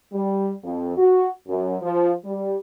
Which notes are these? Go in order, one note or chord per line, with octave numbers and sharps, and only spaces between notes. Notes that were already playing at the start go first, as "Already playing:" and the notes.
G3
F2
F#4
F#2
F3
G3